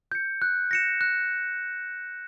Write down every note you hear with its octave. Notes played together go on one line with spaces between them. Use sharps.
G6 C#7
F#6
A#6 C#7 E7
F#6